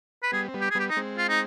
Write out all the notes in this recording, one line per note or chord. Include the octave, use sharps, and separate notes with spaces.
B4
G3 B3 G#4
C4
G3 B3
G4
G#4
G3 B3 G4
D#4
G#3 C4
F4
D#4